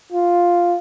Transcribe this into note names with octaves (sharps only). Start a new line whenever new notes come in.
F4